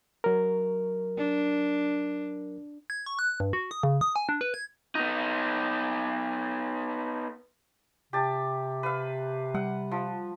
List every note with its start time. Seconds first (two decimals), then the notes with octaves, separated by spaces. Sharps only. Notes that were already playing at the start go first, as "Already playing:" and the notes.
0.24 F#3 A#4
1.18 D4
2.90 G#6
3.06 C#6
3.19 F#6
3.40 G2
3.53 F#4
3.71 D#6
3.83 C#3
4.01 D#6
4.16 G#5
4.29 D4
4.41 B4
4.54 G#6
4.95 B3 D#4
8.13 C3 G4 A5
8.83 B4 F5
9.54 G3 F#5
9.91 F3